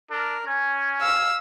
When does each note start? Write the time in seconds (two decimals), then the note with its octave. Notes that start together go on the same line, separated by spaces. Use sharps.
0.11 D4 A#4
0.47 C#4 G#5
1.02 F5 E6